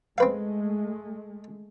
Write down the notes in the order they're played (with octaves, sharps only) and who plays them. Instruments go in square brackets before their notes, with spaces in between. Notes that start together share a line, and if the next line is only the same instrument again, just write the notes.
[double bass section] G#3 A3 [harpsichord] C4 B4 F5